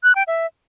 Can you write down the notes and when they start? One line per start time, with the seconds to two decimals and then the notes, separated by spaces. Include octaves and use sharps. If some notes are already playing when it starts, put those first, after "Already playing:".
0.04 F#6
0.15 G5
0.27 E5